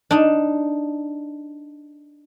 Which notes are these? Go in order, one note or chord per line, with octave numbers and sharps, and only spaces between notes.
D4 D#4